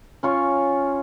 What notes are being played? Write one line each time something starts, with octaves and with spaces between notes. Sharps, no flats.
C#4 F4 C#6